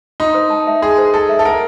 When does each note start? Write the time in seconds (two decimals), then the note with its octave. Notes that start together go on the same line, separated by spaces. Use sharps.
0.20 D#4 C6
0.35 C5
0.50 A5
0.67 E5
0.82 G#4 C6
0.98 C5
1.14 A4 A5
1.29 E5
1.39 A4
1.45 A#4 F#5